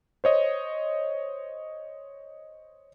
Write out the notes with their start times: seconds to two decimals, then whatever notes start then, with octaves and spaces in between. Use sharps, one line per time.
0.24 C5 C#5 D#5